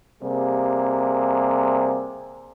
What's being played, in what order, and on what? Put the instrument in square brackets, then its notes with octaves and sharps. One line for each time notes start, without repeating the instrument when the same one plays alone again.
[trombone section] C3 G3 A#3 G#4